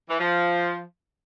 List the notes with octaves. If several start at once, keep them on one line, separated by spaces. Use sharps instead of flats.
E3
F3